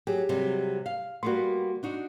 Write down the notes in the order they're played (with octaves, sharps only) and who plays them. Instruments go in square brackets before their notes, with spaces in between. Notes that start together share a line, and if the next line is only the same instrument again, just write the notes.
[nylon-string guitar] F#3 [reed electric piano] G4 G#4
[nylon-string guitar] C3 F#3 G3
F5
[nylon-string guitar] G3 A#3 B3 [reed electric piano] F#4 C6
[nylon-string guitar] D4 D#4 F#4